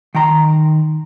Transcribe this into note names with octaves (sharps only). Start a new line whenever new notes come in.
D#3 G5 A#5 C6